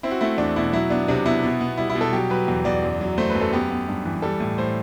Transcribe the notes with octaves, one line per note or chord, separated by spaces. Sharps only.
C4 E4
F#4
A3 E4
E2 D4
B2 E4
F#3 E4
B3 D4
C3 D4
B3 E4
B2
B3
G3 E4
E4
B2
A4
F#3 G4
F#3 B4
E2
E2 D5
F#2
F#3
A3 C5
B4
F#2
A4
B3 G4
B3
G2
E3
G3 A4
A2
A2 C5